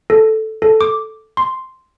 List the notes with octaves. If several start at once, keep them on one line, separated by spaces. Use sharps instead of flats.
A4
A4
D6
C6